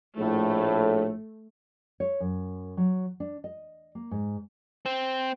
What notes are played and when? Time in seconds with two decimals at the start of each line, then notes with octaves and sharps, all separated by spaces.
0.18 A#1 A2 A3
2.00 C#5
2.20 F#2
2.77 F#3
3.20 D4
3.44 D#5
3.95 A#3
4.11 G#2
4.86 C4